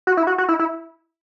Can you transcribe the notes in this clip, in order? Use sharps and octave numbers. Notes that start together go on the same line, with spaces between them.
F#4
E4
F#4
F#4
E4
E4